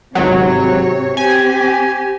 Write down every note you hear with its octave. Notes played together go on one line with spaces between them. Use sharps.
G#1 C3 F#3 C#5
C4 G4 G#5